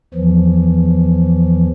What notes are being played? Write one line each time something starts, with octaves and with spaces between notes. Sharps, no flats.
E2 E3 F3